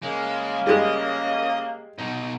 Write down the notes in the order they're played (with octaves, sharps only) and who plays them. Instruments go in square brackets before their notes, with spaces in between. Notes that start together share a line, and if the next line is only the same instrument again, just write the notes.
[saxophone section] C#3 A#3 [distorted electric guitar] G#3
[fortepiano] G3 G#3 [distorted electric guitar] D#5
[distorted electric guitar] B2 D#4